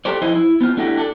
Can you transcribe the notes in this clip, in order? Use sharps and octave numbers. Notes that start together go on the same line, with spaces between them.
G4 A4 C5 D5
F3 E4 B4 C5 D#5
E4
B3 C4 F4
A3 D4 E4 F#4 G4
D4 A4